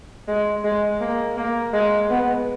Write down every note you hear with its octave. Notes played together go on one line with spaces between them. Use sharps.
G#3
G#3
A#3
A#3
G#3
B3